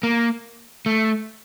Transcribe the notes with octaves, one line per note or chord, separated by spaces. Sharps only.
A#3
A3